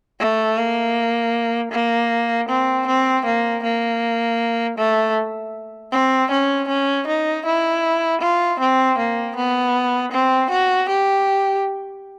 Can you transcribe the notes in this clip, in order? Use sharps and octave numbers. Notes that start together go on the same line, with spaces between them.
A3
A#3
A#3
C4
C4
A#3
A#3
A3
C4
C#4
C#4
D#4
E4
F4
C4
A#3
B3
C4
F#4
G4